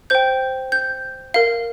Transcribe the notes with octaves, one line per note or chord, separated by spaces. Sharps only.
C5 G5 G6
G6
A#4 F5